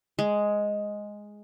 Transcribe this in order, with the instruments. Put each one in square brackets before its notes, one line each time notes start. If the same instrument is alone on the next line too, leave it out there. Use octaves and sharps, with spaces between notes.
[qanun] G#3